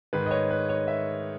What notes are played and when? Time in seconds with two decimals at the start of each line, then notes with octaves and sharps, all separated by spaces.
0.13 G#2 D#3 B4
0.26 D#5
0.31 C#5
0.51 B4
0.69 C#5
0.88 E5